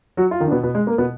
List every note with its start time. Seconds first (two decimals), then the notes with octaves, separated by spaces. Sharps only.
0.17 F#3 F#4
0.31 F4
0.40 D#3 D#4
0.47 D4
0.51 B2 B3
0.63 B2 B3
0.75 G#3
0.87 A#3
0.98 B2 B3